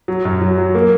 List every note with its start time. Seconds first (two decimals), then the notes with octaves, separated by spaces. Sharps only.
0.08 F#3
0.25 F#2
0.42 F#3
0.58 F#3
0.75 A#3